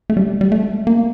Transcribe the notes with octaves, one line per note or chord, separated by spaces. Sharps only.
A3
G3
G3
A3
A#3